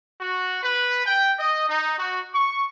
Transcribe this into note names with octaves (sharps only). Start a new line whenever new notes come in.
F#4
B4
G5
D#5
D#4
F#4
C#6